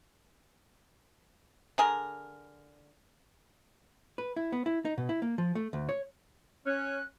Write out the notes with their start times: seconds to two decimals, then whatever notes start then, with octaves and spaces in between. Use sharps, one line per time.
1.78 D3 G#4 A#4
4.18 B4
4.36 E4
4.52 B3
4.66 E4
4.85 D#4
4.98 B2
5.09 E4
5.22 A#3
5.38 F3
5.55 A3
5.73 D2
5.89 C#5
6.67 C#4 F#6